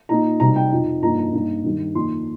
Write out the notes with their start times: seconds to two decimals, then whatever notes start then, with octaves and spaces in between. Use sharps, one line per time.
0.09 A#2 A#3 D#4 A#5
0.40 C3 G3 C4 D#4 A#5
0.56 G5
0.72 F2 F3 D#4
1.02 G2 F3 A#3 D#4 A#5
1.18 A#5
1.33 G2 G3 A#3 D#4
1.64 G2 D#3 G3
1.95 F2 D#3 A#3 D#4 C6